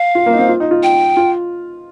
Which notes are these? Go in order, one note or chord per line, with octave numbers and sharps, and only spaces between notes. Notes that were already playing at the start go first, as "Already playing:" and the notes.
Already playing: F5
F4
A#3
D#4
C4
F4
D#4
F4
G5
F4